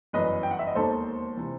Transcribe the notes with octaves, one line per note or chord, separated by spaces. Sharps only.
G1 F#2 E3 B4 D#5
G5
F#5
E5
D#5
E1 D#2 D#3 A4 C5
C3 E3